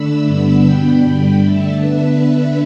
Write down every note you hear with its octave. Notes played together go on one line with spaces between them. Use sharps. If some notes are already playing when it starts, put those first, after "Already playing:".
Already playing: D3 A3 D4 B5 E6
G2 D3 B3 D4
B2 B3 D4 G5 B5
G2 D3 G3
D3 A3 D4 E5 A5
D3 B3 D4 B4 E5
D3 B3 D4